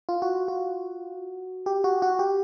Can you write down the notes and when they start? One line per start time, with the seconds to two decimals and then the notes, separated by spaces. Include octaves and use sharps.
0.09 F4
0.22 F#4
0.48 F#4
1.66 G4
1.84 F#4
2.02 F#4
2.19 G4